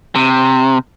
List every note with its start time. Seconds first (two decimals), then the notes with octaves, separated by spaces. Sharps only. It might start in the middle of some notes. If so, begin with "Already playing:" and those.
0.15 C3